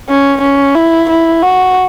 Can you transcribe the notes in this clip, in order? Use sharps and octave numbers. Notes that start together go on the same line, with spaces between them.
C#4
C#4
E4
E4
F#4